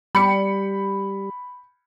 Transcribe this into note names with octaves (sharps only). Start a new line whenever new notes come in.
G3 B5 C#7